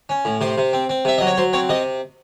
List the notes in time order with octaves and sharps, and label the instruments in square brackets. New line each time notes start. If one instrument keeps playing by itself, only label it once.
[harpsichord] C#4
A2
C3 C5
C3
C4
C4
C3 E5
F#3 D#5
C#5
F#3 C5
C4 C#5
C3 D#5